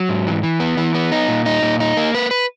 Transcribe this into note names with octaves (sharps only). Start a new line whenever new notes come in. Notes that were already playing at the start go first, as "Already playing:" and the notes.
Already playing: F#3
G#2
E3
E3
B3
E3
B3
D#4
A#2
D#4
A#2
D#4
A#3
B4
B4